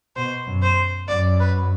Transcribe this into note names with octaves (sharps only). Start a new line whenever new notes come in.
B2 C5
F#2
C5
F#2 D5
B4